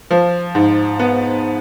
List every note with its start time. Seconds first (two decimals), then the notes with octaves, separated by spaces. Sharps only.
0.11 F3
0.55 G#2
0.99 B3